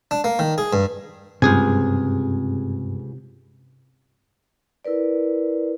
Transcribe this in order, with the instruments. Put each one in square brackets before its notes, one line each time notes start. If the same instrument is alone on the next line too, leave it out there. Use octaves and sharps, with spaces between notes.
[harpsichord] D4
A#3
D#3
G#4
G2
[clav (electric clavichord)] C#2 G#4 G#5 [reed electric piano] G2 [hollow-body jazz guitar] C3
[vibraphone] E4 A#4 B4 D5